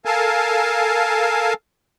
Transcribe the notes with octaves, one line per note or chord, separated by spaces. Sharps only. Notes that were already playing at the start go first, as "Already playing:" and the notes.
A4 A#4 F5 G#5 A5